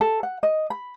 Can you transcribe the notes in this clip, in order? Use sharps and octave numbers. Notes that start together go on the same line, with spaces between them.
A4
F#5
D#5
B5